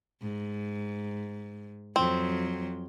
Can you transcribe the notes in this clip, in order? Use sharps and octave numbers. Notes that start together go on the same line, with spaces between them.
G#2
F2 F#3 C4